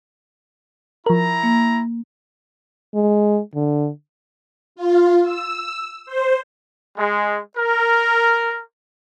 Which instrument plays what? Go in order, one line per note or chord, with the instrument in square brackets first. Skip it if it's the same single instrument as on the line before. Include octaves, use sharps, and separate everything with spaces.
[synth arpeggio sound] F3 A#4 [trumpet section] E4 A#5
[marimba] A#3
[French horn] G#3
D3
[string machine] F4
E6
C5
[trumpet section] G#3
A#4